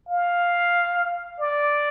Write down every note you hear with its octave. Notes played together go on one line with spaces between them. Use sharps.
F5
D5